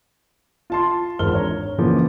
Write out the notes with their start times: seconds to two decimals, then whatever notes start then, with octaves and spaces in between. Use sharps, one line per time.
0.70 F4 A5 C6
1.19 G#1 E2 F4 A#4 F6 G7
1.34 D4 C#5 A#5
1.78 A#2 C#3 E3 F3 A#3 B3